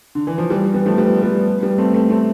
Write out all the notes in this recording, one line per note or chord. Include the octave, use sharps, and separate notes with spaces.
D3
E3
F3
E3 G3
G3 B3
F3 A3
G3 B3
G3 B3
G3 B3
A3 C4
A3 C4
A3 C4